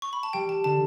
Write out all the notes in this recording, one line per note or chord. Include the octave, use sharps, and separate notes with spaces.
C#6
B5
A5
G3 G5
A5
D3 A5